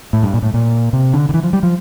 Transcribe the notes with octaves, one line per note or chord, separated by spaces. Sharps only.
A2
G2
A#2
A2
A#2
C3
D3
D3
E3
F3
G3
F3